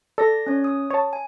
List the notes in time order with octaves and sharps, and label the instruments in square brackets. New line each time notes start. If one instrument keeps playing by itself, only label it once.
[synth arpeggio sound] A4 [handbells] D5 A#6
[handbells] C#4 C#5
D#6
[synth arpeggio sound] C#5 A5
[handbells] G#5